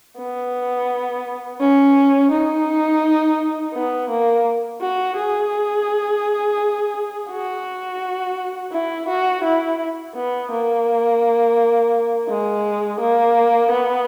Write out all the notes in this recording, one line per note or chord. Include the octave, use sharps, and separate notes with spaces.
B3
C#4
D#4
B3
A#3
F#4
G#4
F#4
E4
F#4
E4
B3
A#3
G#3
A#3
B3